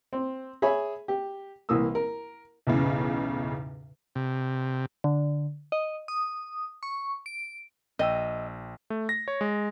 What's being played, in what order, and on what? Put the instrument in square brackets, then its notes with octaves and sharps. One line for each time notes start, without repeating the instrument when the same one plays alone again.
[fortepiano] C4
G#4 C#5 E5 G#5 B5
G4
C2 E3 A#3 D#6 E6
A#4
[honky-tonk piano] B1 E2 A2 C#3
[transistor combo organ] C3
[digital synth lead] D3
D#5
D#6
C#6
D7
[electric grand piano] A#1 G5 E6 [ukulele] D#5
[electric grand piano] A3
A#6
C#5
G#3